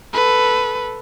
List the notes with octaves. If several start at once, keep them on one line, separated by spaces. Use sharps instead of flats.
A4 B4